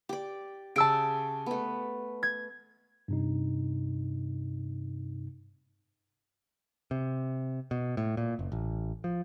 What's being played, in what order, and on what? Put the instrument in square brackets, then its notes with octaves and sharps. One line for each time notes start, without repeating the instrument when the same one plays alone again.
[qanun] G4 D5
[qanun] C#3 G4 G#4 [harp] A5 E6 D7
[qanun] A3 B3
[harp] G#6
[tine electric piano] G2 C3 D#4
[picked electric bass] C3
B2
A2
A#2
F#1
A1
F3